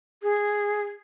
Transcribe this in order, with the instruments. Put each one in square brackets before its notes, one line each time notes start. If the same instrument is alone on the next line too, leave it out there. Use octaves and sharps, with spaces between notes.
[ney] G#4